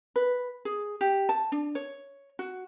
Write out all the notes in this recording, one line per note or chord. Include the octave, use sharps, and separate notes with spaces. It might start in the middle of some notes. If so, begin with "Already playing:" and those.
B4
G#4
G4
A5
D4
C#5
F#4